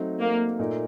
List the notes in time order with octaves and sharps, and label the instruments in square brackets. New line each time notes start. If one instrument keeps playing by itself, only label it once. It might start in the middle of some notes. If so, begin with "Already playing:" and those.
Already playing: [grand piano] F#3 A3 C4 D#4
[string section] A#3
[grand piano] A#2 A3 D#4 A#4